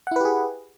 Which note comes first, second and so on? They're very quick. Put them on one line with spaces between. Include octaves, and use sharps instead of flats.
F#5 E4 B4 G4 G#4